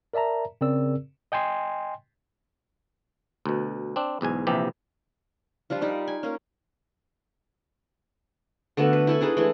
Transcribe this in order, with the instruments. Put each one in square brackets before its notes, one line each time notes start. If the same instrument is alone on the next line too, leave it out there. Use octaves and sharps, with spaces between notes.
[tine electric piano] A#4 D5 E5 A5 A#5
C#3 C4 G#4 A#4 D5 E6
[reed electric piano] D#5 G5 G#5 C6
[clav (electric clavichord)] D2 B2
C4 D4
B1 E2 G#2 G#5
A#1 C3 E3 G4
[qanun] F3 G3 D4 F4
G3 D#4 D5
G#5
A#3 C#4
D3 A3 B3 F#4
B4
E4 A4 G#5
D4 D#4 G#4 B4
E3 G#3 A3 E4